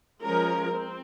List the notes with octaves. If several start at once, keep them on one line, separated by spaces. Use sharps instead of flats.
F3 G#3 C#4 A#4
C4